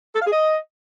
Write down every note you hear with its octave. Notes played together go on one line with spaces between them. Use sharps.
A4
F5
G#4
D#5